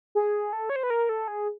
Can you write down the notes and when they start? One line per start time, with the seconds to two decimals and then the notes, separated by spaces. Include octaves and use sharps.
0.15 G#4
0.53 A4
0.69 C#5
0.76 C5
0.83 B4
0.90 A#4
1.09 A4
1.28 G#4